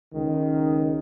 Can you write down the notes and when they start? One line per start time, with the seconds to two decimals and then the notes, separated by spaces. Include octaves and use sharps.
0.14 C#2 D#3